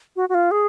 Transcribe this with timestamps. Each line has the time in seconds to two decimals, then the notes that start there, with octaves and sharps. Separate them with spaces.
0.16 F#4
0.29 F#4
0.34 F4
0.51 G#4